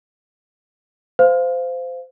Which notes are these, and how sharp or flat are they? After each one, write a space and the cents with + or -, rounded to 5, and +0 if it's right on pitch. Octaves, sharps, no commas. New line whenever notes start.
C5 -25 F5 -5